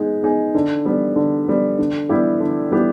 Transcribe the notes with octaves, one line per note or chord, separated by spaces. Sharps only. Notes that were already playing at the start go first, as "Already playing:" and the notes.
Already playing: G#3 B3 D#4 G#4
B3 D#4 G#4
D3
G3 B3
D3
G3 B3
D3
G3 B3 E4 G4
D3
G3 B3 E4 G4